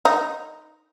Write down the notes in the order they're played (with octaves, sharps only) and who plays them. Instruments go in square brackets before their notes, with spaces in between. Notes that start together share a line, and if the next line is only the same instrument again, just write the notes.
[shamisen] D#4